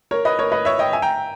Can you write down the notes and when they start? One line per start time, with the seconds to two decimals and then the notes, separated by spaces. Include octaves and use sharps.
0.11 A#4 C#5
0.25 B4 D#5
0.39 A#4 C#5
0.52 B4 D#5
0.65 C#5 E5
0.79 D#5 G5
0.92 E5 G#5
1.02 G5 A#5